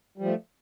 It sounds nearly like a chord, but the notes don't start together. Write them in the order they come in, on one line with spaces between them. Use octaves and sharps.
G3 F3 A3